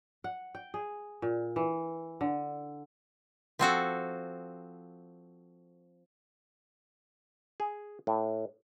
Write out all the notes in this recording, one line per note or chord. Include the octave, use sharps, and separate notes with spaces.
F#5
G5
G#4
A#2
E3
D3
F3 C4 F#4 A4
G#4
A2